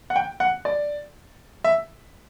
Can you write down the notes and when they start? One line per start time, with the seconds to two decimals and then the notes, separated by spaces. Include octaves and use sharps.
0.10 F#5
0.16 G5
0.40 F#5
0.65 D5
1.64 E5